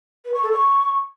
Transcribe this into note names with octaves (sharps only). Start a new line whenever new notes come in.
B4
C#6
A4
C#6